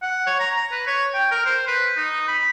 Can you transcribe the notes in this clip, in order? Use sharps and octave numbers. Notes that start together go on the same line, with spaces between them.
F#5
C#5
A#5
A#5
B4
C#5
G5
A#4
C5
B4
D#4
B5